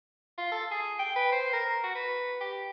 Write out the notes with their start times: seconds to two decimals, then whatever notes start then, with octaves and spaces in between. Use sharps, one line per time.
0.38 F4
0.52 A4
0.71 G#4
0.99 G5
1.16 B4
1.32 C5
1.53 A#4
1.84 F#4
1.95 B4
2.41 G4